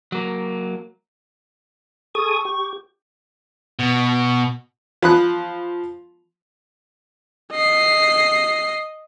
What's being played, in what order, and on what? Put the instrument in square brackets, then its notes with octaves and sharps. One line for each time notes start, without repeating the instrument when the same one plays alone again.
[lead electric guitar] F#3 A#3
[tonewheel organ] G#4 A4 D#6 [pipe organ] C#6
[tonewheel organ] G4
[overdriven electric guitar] B2
[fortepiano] F3 B5 F#6
[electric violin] D#5 C7